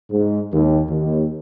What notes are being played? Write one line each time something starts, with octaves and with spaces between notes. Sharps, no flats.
G#2
D#2
D#2